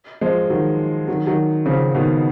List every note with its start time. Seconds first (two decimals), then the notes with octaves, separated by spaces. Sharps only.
0.21 F3 G#3
0.50 D#3 F#3
1.08 D#3 F#3
1.27 D#3 F#3
1.66 C#3 F3
1.95 B2 D#3